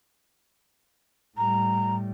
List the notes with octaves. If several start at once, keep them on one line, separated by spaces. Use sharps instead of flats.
A2 G3 A#5